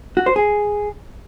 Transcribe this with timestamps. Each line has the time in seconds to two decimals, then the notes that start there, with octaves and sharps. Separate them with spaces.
0.17 F#4
0.26 C5
0.36 G#4